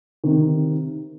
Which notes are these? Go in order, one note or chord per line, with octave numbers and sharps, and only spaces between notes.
C3 D#3